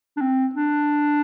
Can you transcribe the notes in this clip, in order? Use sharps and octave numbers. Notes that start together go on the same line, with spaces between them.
D4
C4
D4